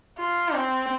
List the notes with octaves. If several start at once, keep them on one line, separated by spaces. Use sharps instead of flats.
F4
C4